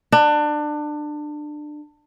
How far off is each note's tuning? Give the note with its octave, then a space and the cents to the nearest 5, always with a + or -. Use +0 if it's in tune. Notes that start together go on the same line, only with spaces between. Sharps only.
D4 +25